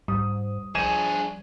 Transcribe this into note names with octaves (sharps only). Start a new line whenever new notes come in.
G#2 G3 D#6
F3 D4 G#4 G#6 D#7 E7